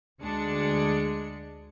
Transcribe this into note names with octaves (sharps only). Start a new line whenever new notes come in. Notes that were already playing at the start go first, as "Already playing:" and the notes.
D2 G#3 D4 C#7